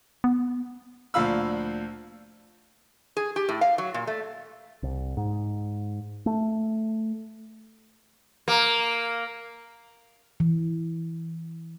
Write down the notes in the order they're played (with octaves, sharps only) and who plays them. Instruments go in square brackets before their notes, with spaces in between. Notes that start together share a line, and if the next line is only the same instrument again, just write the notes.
[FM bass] B3
[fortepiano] D2 A#2 F3 F5 B5 E6
[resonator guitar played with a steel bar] G#4
G4
A2
F5
F#3
A#2
A3
[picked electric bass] C2
G#2
A3
[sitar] A#3
[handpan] E3